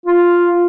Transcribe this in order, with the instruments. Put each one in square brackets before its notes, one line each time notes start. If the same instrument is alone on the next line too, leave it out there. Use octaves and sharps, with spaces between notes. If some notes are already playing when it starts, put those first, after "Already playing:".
[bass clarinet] F4